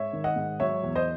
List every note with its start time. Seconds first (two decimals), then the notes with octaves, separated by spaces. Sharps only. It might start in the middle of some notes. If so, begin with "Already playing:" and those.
Already playing: G#2 C#5 E5
0.13 D#3
0.24 D#5 F#5
0.36 G#2
0.60 F#3 C#5 E5
0.83 E2
0.95 C5 D#5